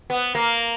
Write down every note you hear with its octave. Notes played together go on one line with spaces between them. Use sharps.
B3
A#3